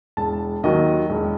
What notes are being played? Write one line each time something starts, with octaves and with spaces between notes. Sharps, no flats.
E1 A5
D#2 D#3 F#3 D#5
E1